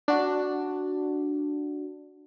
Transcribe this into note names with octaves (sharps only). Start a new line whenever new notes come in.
D4 F#4